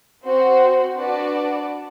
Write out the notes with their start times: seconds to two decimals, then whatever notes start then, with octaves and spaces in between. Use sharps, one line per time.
0.23 C4 F#4 C5
0.98 D4 F#4 B4 D5 A5